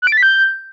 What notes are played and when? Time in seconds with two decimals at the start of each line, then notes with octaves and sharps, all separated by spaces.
0.02 F#6
0.07 D7
0.12 A6
0.17 B6
0.23 G6